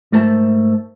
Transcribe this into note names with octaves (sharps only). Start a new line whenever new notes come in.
G#2 A3 A#4 C5 E5 A5